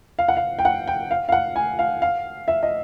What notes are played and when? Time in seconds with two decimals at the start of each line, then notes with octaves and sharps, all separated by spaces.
0.19 F5
0.28 F#5
0.37 F5
0.59 G5
0.65 F#5
0.88 G5
1.11 F5
1.29 F5
1.32 F#5
1.56 G#5
1.79 F5
2.02 F5
2.48 E5
2.63 D#5